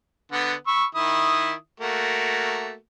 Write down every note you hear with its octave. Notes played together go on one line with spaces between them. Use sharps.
D3 B3 F#5
B5 C#6 E6
D#3 E4 D#6
A3 A#3 F#4